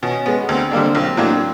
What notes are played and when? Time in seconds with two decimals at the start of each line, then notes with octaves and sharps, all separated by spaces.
0.03 B2 C#4
0.26 G#3 B3
0.38 B3
0.49 D2 C4
0.71 D3 G3 A#3 D4
0.94 B1 C4
1.17 A2 F#3 A#3 D4